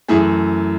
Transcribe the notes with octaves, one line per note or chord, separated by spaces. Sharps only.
F#2 E3 A3 E4 G#4